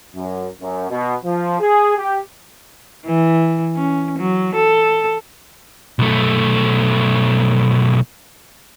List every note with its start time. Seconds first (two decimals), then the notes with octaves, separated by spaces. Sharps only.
0.15 F#2
0.61 F#2
0.90 B2
1.24 F3
1.60 G#4
1.97 G4
3.06 E3
3.76 C#4
4.18 F#3
4.55 A4
5.99 B1 A3